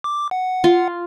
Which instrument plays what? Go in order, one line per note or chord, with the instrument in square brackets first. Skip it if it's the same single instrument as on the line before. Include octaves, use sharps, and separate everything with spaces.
[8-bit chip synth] D6
F#5
[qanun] F4